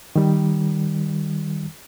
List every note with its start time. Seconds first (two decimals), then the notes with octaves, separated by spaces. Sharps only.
0.16 D#3 G3